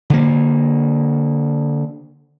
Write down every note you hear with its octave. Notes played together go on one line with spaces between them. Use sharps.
D3 A#3